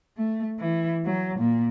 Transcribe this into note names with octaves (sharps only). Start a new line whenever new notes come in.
A3
E3
F#3
A#2